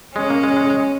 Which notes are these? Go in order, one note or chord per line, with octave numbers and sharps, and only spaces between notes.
G#3 C#4
A#3
G#3
G#3
G#3